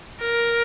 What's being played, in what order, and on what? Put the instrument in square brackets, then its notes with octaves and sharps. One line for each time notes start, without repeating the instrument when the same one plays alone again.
[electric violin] A#4